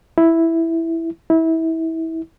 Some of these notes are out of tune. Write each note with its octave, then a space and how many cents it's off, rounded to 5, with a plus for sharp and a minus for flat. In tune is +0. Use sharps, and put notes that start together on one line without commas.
E4 +0
E4 -25